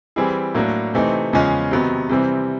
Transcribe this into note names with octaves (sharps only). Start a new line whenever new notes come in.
E3 G3 C4 E4 G#4
A2 F#3 A#3 D4
C3 E3 A3 C4 D#4
E2 C#3 F3 G#3 C#4
C3 D#3 F#3 B3
C3 E3 G3 C4